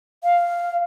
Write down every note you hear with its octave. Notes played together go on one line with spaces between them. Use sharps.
F5